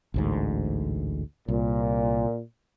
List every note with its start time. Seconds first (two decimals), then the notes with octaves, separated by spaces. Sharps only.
0.14 A1 D2 G#2
1.48 C2 A#2